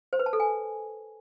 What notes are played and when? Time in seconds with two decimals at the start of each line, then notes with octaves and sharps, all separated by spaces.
0.13 C5
0.19 B4
0.26 A5
0.33 A4
0.40 G#5